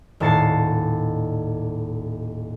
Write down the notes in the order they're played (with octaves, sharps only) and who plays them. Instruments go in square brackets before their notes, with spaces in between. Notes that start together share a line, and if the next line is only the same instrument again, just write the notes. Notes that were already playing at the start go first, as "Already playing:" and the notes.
[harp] D#1 A2 A5 A6 C7 C#7